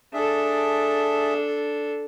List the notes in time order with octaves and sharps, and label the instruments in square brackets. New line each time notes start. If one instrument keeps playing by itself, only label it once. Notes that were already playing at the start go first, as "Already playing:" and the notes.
[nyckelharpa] D4 A4 [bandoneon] G#4 E5